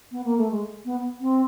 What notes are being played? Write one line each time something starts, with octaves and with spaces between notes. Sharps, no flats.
B3
A#3
A3
G#3
B3
C4